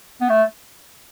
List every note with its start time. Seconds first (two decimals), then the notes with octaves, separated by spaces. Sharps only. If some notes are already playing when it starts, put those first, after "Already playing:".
0.21 B3
0.29 A3